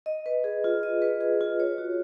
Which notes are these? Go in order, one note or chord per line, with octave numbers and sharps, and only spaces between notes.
D#5
B4
G#4
F4
D#5
B4
G#4
F4
C#5
F#4